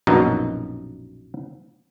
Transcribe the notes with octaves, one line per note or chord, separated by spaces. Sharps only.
A#1 F#2 B2 D#4